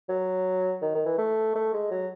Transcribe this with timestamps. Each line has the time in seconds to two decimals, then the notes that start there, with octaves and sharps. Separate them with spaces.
0.09 F#3
0.82 D#3
0.95 D#3
1.06 E3
1.18 A3
1.55 A3
1.74 G#3
1.91 F#3